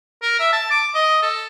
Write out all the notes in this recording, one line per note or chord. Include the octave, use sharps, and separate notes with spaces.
A#4
E5
A5
D6
D#5
A4